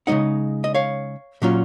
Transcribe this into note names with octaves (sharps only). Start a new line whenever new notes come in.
C#3 G#3 D#4 D#5 F#5
D#5
C#5 F5
A#2 F#3 C#4 F4